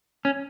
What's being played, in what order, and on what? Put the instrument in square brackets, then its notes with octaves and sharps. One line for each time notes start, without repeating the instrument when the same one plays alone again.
[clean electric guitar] C#4